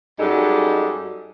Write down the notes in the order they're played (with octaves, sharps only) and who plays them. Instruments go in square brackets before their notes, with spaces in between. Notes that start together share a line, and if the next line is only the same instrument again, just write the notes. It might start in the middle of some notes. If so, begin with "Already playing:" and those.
[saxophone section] F#2 G3 G#3 D#4 A4